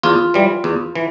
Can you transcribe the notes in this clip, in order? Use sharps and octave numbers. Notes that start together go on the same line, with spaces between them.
E2 F4
E3 G3
E2
E3